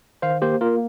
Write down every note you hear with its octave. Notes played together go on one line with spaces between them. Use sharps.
D#3 C5 F5
A#3 G4 C5
A#3 F4 A#4